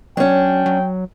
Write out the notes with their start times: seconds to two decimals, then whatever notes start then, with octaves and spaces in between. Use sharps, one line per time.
0.17 F#3 C#4 D4 G5
0.66 F#3